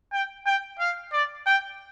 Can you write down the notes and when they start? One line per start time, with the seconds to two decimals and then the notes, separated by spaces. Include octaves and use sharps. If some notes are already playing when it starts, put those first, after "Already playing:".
0.13 G5
0.46 G5
0.80 F5
1.13 D5
1.46 G5